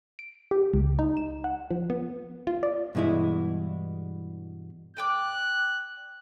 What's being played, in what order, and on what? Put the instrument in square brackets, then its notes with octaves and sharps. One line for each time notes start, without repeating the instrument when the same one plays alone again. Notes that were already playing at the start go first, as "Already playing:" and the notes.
[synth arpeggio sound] D7
G4
C#2
D#4
E7
F#5
F3
B3
F4
D5
[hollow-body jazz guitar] G2 B2 E3 G#3 E4
[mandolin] D5 G5 D6 [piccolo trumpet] F#6